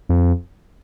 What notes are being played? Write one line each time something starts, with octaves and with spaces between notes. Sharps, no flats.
F2